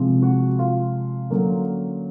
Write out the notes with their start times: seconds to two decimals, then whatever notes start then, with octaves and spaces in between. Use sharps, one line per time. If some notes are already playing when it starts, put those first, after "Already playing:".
Already playing: C3 F3 G#3 C4
0.22 F#4
0.59 F4
1.31 D3 F#3 A#3 C#4